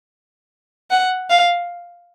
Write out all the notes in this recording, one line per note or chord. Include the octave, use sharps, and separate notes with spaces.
F#5
F5